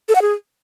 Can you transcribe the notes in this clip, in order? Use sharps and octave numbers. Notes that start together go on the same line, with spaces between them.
A4
F#5
G#4